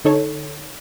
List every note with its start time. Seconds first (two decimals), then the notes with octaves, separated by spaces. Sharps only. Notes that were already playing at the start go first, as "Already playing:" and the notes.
0.04 D3 D#4 A4 C#5